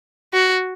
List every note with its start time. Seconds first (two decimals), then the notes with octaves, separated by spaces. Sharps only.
0.33 F#4